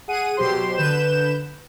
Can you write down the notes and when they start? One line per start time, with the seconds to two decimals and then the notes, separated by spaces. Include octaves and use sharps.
0.08 G#4 F#5 D#7
0.37 B2 F#3 G4 C5 C6
0.76 D3 B4 G6 E7